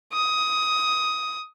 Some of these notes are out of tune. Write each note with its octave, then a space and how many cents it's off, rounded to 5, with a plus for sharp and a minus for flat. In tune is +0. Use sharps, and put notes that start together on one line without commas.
D#6 +15